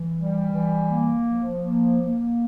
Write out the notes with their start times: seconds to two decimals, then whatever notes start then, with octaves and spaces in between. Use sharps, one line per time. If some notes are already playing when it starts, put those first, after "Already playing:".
Already playing: E3
0.14 G3
0.52 E3
0.89 A#3
1.27 F3
1.64 A#3
2.01 A#3